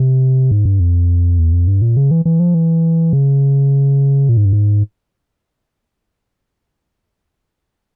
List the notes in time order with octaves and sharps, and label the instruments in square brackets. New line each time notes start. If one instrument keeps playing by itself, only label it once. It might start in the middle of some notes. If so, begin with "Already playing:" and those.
Already playing: [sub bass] C3
G#2
G2
F2
E2
F2
G2
A#2
C#3
E3
E3
F3
E3
C#3
A#2
G#2
G2
G#2